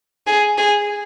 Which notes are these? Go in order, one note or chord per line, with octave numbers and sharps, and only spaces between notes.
G#4
G#4